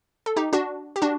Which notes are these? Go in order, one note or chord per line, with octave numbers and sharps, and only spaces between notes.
A4
D#4 G4
D4 F#4
G4
D4 F#4